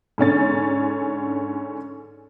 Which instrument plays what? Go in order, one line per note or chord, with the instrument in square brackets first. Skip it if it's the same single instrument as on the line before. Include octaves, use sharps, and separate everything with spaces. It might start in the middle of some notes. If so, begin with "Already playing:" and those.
[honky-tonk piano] G#2 D3 C#4 A6